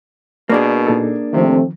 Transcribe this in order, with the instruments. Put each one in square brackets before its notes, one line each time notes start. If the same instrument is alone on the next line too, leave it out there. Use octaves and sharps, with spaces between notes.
[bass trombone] B2 [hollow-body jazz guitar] A#3 D4 G#4 [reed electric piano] A#4 D5
[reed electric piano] A#2 D#4 A4
[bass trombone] C3 [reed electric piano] D#3 F3 [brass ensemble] A3 C4